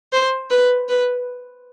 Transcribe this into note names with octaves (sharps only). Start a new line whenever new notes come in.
C5
B4
B4